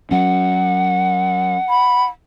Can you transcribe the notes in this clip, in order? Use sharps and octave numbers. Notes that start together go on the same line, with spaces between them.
F#3 C#4 F#5
B5